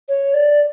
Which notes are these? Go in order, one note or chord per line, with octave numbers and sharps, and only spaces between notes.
C#5
D5